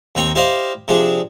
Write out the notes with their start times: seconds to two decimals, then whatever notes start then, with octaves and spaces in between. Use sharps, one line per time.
0.15 D#2 C4 G5 A#5 C#6
0.35 E4 G4 C5 D5 D#5 F5
0.88 C3 F3 D4 G#4